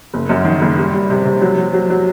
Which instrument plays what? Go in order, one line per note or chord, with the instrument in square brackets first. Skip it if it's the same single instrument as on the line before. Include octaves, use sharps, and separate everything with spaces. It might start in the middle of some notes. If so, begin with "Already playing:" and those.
[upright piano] F#1
F#2
D#3
F#1
G3
G3
C3
C3
F#3
F#3
F#3
F#3